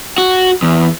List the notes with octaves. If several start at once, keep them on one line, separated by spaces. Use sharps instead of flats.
F#4
E2